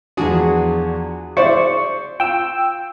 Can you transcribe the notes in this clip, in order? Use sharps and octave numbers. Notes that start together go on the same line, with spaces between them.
E2 F3 D4 F#4 G#4 D#6
C5 D5 E5 C#6
F4 G5 E6